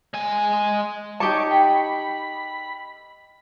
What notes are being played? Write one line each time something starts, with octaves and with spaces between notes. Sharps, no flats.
G#3 G#5
D#4 G4 C#5 A5 C#6 D6
G5 B5